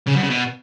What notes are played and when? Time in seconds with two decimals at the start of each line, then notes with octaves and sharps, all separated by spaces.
0.07 C#3
0.15 F#2
0.23 C#3
0.30 B2